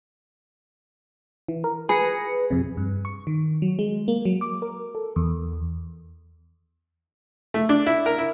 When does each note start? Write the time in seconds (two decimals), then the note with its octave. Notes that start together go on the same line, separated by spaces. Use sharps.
1.48 E3
1.64 A#4
1.89 G#4 B4 A#6 C#7
2.51 F2 C3
2.77 G2
3.05 C#6
3.27 D#3
3.62 F#3
3.79 G#3
4.08 A#3
4.25 F#3
4.41 D6
4.62 A#4
4.95 A4
5.16 E2
7.54 A3
7.69 D4
7.86 E4
8.06 A#4
8.18 E4